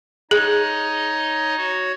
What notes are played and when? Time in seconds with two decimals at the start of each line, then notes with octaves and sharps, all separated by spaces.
0.31 D#4 G#4 C#5 D#5
1.57 F#4 C#5